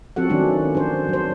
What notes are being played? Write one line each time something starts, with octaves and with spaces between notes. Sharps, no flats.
F3 C4 F#4 A4 F#5
D#3 F#3 A3 C#4 D4
D4 C5
F#3 C5